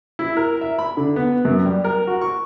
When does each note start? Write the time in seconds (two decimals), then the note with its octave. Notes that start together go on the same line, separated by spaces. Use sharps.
0.19 E4
0.37 A#4
0.61 E5
0.79 B5
0.97 D3
1.16 B3
1.45 F#2
1.65 G3
1.84 A#4
2.07 F#4
2.21 C#6